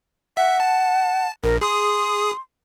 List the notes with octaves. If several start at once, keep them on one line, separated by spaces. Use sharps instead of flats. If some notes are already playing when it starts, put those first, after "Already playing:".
E5 F#5
A5
A#1 A#4
G#4 C6 D#6